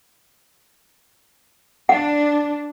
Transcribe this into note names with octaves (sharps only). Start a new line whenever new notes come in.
D4 F#5